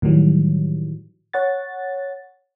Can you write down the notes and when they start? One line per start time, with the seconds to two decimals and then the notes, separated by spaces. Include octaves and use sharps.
0.02 A2 D#3 E3 F#3 G3
1.33 C#5 F#5 A6